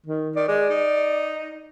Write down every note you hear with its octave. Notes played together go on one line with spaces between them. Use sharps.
D#3
D#3 D5
G#3 D5
D#4